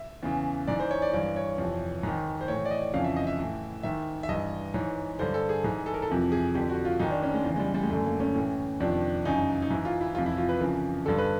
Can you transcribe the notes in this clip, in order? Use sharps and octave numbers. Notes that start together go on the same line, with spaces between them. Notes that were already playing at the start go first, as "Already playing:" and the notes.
Already playing: E5
E2 C#3 E3
G#2 E3 D5
C5
C#5
D5
G2 E3 D5
C#5
F2 C3 E3
G#2 D#3
C5
A2 E3 C#5
D5
D#5
F2 C#3 E3 F5
E5
D#5
E5
A2 E3
G#2 D#3 E5
E5
G2 E3 D#5
G#2 E3 C#5
G2 D3 C5
A4
G#4
G#2 E3 G#4
A4
A#4
A4
F2 C3 E3
G#4
F2 D3 G4
F#4
F4
G#2 D#3 D#4
D4
C#4
G#3
E2 C#3 E3
G#3
G3
G3
G#3
F#2 D3 A3
A#3
C#4
A2 E3
F2 C3 D#3 D4
F#2 C#3 E3 D#4
D#4
G#2 E3 E4
F4
E4
F2 C3 E3 F4
E4
F4
B4
F2 C#3 E3 A#4
G2 D3 A4
B4